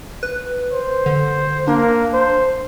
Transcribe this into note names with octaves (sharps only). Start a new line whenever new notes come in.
B4
C5
D3
A#3 D4
C5